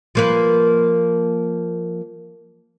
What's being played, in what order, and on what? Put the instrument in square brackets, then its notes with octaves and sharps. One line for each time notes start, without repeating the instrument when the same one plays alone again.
[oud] F3 A#3 B4